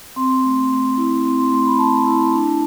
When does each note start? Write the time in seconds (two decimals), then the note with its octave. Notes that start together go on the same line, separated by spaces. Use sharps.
0.16 C4 C6
0.44 A3
0.71 A3
0.97 E4
1.25 C4 C6
1.38 C6
1.52 A3 C6
1.66 B5
1.79 A3 A5
2.06 E4
2.34 D4